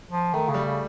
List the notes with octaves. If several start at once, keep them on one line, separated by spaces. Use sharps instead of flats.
F3
D#3 A3
C#3
G3
C#3